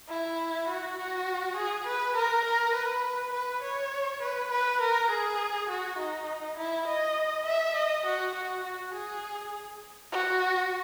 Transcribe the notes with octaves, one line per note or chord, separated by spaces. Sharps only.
E4
F#4
F#4
G#4
B4
A#4
A#4
B4
B4
C#5
B4
B4
A#4
G#4
F#4
D#4
E4
D#5
E5
D#5
F#4
F#4
F#4
G#4
F#4